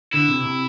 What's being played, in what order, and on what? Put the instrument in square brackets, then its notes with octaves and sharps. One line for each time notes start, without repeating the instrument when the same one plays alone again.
[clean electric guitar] D3 [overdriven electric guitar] E4
[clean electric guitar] C3
C3